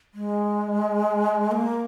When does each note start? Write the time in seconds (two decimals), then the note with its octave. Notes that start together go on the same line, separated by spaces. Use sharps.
0.14 G#3
1.52 A#3